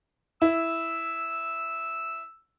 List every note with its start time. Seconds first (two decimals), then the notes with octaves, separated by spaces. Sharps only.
0.42 E4 E6